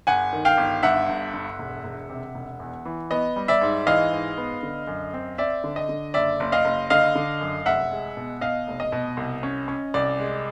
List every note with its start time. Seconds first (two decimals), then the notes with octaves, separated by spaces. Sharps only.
0.07 G1 F#5 G#5
0.33 D#3
0.45 F5 G5
0.57 G1
0.83 G2 E5 F#5
1.09 G1
1.33 G1
1.59 E1
1.84 E1
2.10 C3
2.35 E1
2.60 E2
2.85 E3
3.11 B3 D#5
3.36 G3
3.48 D5 E5
3.61 G#2
3.87 E3 D#5 F5
4.12 G#2
4.37 B3
4.63 D3
4.87 F#2
5.14 C4
5.38 C4 D5 E5
5.64 D3
5.76 D#5
5.89 D3
6.14 F#1 D5 E5
6.40 F#1
6.52 D#5 F5
6.65 F#1
6.90 D3 D#5 F5
7.15 D3
7.41 F#2
7.66 F1 E5 F#5
7.91 G#3
8.17 B2
8.41 B2 D#5 F5
8.67 F1
8.80 D#5
8.92 B2
9.17 C2
9.43 C#4
9.68 C#4
9.94 C2 D5
10.19 G#3